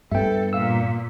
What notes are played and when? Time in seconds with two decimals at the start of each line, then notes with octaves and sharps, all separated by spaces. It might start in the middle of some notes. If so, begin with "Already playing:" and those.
0.12 G2 B3 A4 E5 G5
0.53 A#2 F5 E6